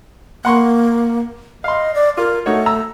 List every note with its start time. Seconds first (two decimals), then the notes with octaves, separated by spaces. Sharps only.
0.45 A#3 F#5 C6 C#6
1.64 D#5 F5 C6
1.94 D5
2.17 F4 A#4
2.46 A3 D#4 F#4 C#5
2.66 A#5 E6